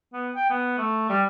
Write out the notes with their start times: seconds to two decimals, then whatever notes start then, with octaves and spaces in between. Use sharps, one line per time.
0.13 B3
0.36 G5
0.50 B3
0.78 A3
1.10 G3